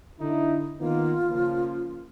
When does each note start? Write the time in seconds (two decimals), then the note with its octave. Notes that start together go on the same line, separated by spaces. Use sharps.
0.19 D3 D#4 E4
0.80 D#3 A#3 B3 F4
1.29 C#3 F3 A#3